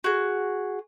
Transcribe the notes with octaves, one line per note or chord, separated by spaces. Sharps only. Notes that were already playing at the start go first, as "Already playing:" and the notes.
F#4 G#4